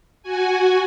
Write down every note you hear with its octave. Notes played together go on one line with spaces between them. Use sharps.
F#4 G#5